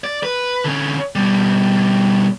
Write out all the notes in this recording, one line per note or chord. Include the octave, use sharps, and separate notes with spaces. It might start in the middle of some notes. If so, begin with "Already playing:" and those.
D5
B4
D3 C#4
B2 G3